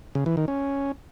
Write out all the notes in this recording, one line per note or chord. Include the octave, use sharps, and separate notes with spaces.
C#3
E3
D#3
C#4